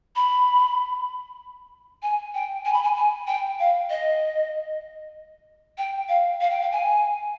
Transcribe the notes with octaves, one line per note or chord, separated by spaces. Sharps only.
B5
G#5
G5
G#5
B5
G#5
G#5
G5
F5
D#5
G5
F5
F5
G5
F5
G#5